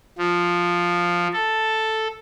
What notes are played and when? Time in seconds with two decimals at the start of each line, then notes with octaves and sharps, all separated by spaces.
0.18 F3
1.33 A4